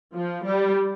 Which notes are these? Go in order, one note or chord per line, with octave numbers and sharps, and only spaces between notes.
F3
G3